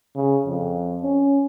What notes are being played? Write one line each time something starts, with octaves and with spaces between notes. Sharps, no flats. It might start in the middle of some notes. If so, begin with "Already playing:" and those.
C#3
F2
C#4